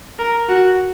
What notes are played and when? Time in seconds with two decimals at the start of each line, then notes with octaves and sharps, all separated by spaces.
0.19 A#4
0.49 F#4